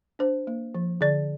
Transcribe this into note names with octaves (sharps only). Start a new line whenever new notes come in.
D4 C5
A#3
F3
D3 D5